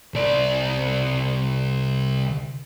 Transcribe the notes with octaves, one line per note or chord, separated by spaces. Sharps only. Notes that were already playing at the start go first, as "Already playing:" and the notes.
C2 D5